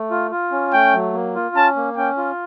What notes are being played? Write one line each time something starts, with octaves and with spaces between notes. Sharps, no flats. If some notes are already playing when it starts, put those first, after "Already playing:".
Already playing: A3
F4
F4
C#4
A3 G5
F#3
A#3
F4
C#4 A5
A#3
C#4 G5
F4